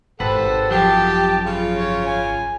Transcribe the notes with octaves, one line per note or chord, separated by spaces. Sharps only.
G#1 G4 A4 B4 C5 F#5
F#2 F3 F#3 G4 A5
C#3 F4
C#5
G#5